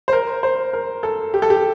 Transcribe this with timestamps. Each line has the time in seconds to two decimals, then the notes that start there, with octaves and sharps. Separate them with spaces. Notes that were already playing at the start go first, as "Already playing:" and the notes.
0.08 C5
0.13 A#4
0.43 C5
0.73 A#4
1.03 A4
1.34 G4
1.42 A4
1.50 G4